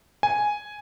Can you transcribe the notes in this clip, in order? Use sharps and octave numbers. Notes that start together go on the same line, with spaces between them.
G#5